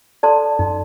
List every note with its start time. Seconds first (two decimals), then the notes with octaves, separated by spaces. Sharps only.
0.23 A4 D5 A5 C6
0.59 F#2 D#4